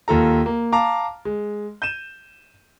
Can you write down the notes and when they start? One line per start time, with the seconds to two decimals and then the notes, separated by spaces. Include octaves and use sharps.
0.08 D#2 F4 A4 A#5
0.46 A#3
0.72 F5 A5 A#5 D6
1.25 G#3
1.82 G6 D#7 E7